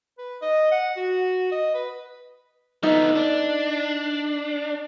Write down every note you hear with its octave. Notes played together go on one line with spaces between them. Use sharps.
B4
D#5
F#5
F#4
D#5
B4
D3 B3 D#4
D4